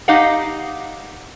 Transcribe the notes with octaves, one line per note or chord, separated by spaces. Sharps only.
D#4 G4 D#5 F5 F#5